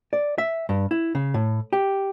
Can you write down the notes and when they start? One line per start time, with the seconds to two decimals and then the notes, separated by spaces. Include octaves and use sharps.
0.13 D5
0.38 E5
0.69 G2
0.91 E4
1.15 C#3
1.34 A2
1.73 G4